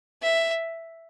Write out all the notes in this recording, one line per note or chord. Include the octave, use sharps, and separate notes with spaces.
E5